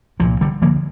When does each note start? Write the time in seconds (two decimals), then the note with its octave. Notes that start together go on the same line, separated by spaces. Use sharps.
0.19 C2 F3
0.23 A#2
0.41 D3 G3
0.62 D2 D3 F3 A#3